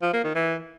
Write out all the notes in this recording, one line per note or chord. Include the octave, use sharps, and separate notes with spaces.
F3
A#3
D#3
E3